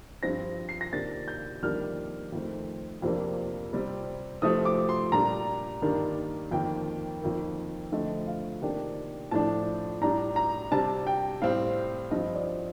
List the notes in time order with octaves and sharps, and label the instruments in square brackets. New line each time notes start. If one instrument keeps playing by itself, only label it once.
[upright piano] G2 F3 C4 A#6
C7
A#6
C3 D#3 A#3 D4 A6
G6
F2 D#3 G3 A#3 D4 F6
F2 D#3 A3 C4
F2 C3 F3 A#3 D4
C3 G3 C4
C3 F3 A3 C4 D#6
D6
C6
A#2 G3 D4 A#5
G2 D#3 G3 A#3 D4
F2 D#3 A#3 G5
F2 D#3 A#3
D3 F3 A3 C4 D#5
F5
C3 D#3 A#3 D4 G5
A2 F3 A3 D4 A5
A2 G3 D4 A#5
A#5
C3 G3 D4 A5
G5
A2 G3 C4 F5
G2 F3 C4 D#5
D5